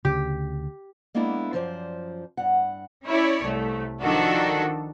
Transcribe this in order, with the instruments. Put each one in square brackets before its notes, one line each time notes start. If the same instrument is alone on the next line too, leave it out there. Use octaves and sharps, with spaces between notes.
[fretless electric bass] D2 C#3 [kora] G4
[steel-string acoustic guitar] G#3 A#3 B3 D4 E4 A4
F#2 F3 C5 D5
G2 F#5
[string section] C#4 E4 C#5 D5
C2 A3
D#3 F3 D4 F#4 A4